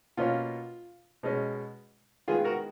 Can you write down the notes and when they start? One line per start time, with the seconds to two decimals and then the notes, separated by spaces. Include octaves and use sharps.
0.17 B2 A#3 C#4 F4
1.23 B2 G#3 C#4
2.28 D#3 G#3 B3 F4 G#4
2.44 F#4 A#4